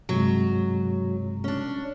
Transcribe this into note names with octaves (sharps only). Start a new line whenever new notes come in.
G2 C3 F#3 G#3
C#4 D4